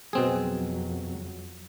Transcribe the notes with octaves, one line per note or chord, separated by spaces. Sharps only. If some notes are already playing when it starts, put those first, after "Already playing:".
F2 B2 F#3 C4 G#4